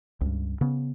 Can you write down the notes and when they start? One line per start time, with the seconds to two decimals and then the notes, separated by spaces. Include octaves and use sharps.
0.21 C#2 G2
0.61 C#3 B3